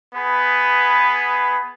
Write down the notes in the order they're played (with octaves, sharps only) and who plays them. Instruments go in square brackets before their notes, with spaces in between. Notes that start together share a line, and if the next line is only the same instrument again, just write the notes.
[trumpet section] B3 G#4 B4 B5